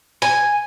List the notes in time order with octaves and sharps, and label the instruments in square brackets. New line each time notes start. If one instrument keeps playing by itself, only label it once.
[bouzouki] G#5